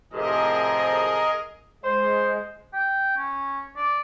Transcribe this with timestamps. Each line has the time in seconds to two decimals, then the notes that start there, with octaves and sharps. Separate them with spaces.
0.13 A2 C3 F3 G#4 A#4 D#5
1.83 G#3 C5
2.73 G5
3.17 C#4
3.77 D5